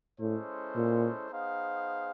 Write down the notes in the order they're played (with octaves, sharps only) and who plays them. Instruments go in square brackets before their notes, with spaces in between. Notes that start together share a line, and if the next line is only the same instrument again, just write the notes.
[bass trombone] A2 [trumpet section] G#3 C#4 E4 A4 C5
[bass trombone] A#2
[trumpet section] B3 D#4 G#4 C5 F5